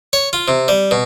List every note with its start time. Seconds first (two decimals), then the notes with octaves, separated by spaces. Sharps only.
0.13 C#5
0.33 F4
0.48 C3
0.68 G3
0.91 B2